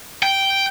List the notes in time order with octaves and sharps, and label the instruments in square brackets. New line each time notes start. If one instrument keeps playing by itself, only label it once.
[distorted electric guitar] G5